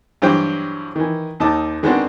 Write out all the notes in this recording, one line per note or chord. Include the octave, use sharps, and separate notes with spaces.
G2 E3 F#3 G4 C5 G5
D#3 E3
D#2 D#4 A5 D6
D#3 G#3 B3 C4 D4 F#4